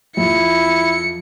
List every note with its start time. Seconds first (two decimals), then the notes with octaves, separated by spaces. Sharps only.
0.17 F2 E4 C#7